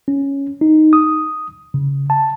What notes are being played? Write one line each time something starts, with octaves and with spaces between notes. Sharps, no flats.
C#4
D#4
D#6
C#3
A5